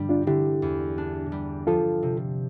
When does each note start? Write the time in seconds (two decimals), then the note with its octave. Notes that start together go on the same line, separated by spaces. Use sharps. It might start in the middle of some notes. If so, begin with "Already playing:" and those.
Already playing: G2 D3 G3
0.09 D4 F4
0.27 D3 E4 G4
0.62 E2
0.98 D4
1.32 G3
1.67 F3 F4 A4
2.03 C3